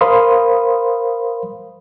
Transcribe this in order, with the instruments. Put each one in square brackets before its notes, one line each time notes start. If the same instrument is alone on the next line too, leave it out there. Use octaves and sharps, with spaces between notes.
[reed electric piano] A#4 C5 F5 B5 C6 D#6